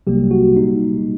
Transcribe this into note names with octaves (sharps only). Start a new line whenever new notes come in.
C2 C3 F#3 G3 A#3 G4
F#4
A#2 G3 A#3 D#4